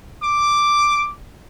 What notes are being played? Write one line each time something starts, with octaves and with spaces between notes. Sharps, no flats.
D6